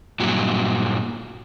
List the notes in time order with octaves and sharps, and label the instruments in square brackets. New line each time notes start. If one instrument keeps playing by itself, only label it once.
[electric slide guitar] G2 A#2 F#3